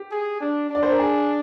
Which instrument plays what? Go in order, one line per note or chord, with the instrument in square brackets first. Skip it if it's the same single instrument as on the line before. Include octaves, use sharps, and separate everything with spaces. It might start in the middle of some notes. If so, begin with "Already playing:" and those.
Already playing: [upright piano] G4
[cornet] G#4
D4
D4
[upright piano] D5
C5
A#4
G#4